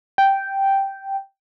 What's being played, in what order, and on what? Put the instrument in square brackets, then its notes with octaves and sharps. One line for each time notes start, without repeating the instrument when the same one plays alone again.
[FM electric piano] G5